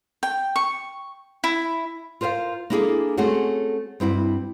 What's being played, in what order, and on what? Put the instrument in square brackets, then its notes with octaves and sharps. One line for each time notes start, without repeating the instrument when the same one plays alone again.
[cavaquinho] G5
C#6
E4
[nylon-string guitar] F4 A#4 C5 E5 F5
A#3 D4 E4 F4 G#4 A4
A3 C4 C#4 F#4 G#4 C#5
G2 C4 E4 F#4